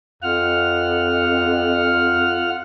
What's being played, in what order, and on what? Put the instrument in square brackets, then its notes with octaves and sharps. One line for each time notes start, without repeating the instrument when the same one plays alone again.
[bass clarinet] F2 [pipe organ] F4 F#5 F6